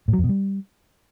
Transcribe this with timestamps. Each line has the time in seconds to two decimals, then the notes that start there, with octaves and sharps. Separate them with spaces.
0.08 A2
0.13 F#3
0.19 F2
0.24 B2
0.29 G3